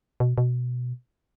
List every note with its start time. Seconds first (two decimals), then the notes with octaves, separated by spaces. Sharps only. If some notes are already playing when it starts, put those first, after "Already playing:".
0.20 B2
0.38 B2